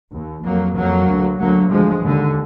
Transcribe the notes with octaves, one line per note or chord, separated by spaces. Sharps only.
D#2
F2 F#3 A#3
F2 F#3 A#3
D2
D2 F#3 A#3
D2 F3 G#3
D#2 D3